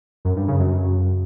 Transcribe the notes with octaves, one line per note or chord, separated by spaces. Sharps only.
F#2
G2
C#3
F#2